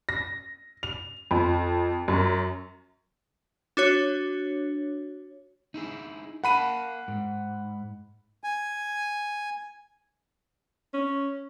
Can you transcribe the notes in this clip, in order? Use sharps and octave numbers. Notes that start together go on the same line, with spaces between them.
A#6
F7
F2
F#2
D4 F#4 C#5
D#4 E4 G#4
A#4 F5 F#5 A5 B5 D#7
G#2
G#5
C#4